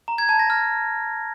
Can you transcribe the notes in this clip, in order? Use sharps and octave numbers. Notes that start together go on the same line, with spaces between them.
A#5
G#6
A5
A#6
F6